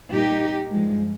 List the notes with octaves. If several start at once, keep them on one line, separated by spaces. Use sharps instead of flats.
A#2 G3 A#3 D#4 G4
G2 F3 G#3